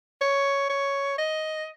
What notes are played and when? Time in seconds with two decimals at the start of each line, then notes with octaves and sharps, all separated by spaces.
0.21 C#5
0.69 C#5
1.18 D#5